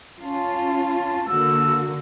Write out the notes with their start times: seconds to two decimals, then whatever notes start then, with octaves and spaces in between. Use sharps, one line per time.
0.22 C#4 F4 A5
1.28 D3 A#3 F#4 E6